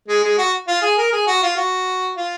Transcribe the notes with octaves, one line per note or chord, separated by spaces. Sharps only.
G#3
G#3
F#4
F4
G#4
A#4
G#4
F#4
F4
F#4
F4